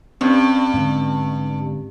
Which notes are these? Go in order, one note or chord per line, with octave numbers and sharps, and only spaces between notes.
G2 C4 C#4
G#2 D3